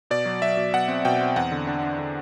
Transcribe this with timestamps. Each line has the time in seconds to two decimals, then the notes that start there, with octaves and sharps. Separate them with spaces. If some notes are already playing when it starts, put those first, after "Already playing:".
0.11 B2 D5
0.26 F#3
0.42 F#3 E5
0.57 B2
0.74 B2 F#5
0.88 C4
1.05 B2 G5
1.21 C4
1.36 E2 F#5
1.52 D3
1.67 D4
1.83 D4
1.99 D3